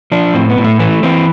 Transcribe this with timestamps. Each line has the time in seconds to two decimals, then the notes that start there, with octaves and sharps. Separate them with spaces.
0.12 F3 D4
0.34 A2 C4
0.49 B3
0.58 A2
0.64 A3
0.79 E3 A3
1.03 E3 C4